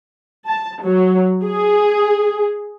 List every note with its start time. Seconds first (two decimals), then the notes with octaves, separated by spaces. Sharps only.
0.47 A5
0.83 F#3
1.44 G#4